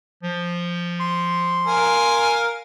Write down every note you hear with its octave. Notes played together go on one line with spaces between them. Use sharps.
F3
C6
A#4 F5 G#5